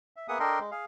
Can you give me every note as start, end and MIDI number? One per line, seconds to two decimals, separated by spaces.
0.16 0.28 76
0.28 0.38 58
0.28 0.38 59
0.28 0.38 68
0.28 0.38 76
0.28 0.38 78
0.28 0.38 87
0.40 0.59 62
0.40 0.59 69
0.40 0.59 70
0.40 0.59 75
0.40 0.59 79
0.40 0.59 84
0.60 0.71 56
0.71 0.85 68
0.71 0.85 77